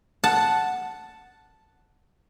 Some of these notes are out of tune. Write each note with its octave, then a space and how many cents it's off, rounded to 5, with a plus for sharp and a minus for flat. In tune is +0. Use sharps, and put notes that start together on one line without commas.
F#5 +0 A5 +0